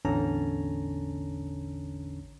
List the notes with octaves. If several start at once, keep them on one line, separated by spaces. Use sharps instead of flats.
A1 E2 D3 C#4 A5 A#5